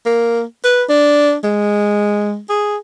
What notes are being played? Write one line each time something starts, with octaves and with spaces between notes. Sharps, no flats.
A#3
B4
D4
G#3
G#4